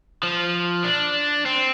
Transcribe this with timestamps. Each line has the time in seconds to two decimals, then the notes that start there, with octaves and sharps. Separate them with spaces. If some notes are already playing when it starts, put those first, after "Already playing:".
0.23 F3
0.84 D4
1.46 C4